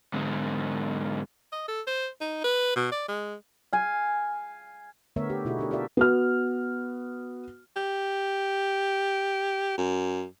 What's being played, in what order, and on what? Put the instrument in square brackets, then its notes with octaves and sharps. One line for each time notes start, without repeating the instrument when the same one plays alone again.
[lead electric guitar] G#2 D3
[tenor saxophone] D#5
A4
C5
D#4
B4
B2
D5
G#3
[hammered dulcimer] F5 G#5
[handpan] D3 A3 B3 A#4 C#5 E5
G4
B2 D#4 E4 F#4 G#4
D4 G4 A#4
F4 G4 A4 A#4 D5 E5
[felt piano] B3 F#4 F6
[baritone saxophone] G4
F#2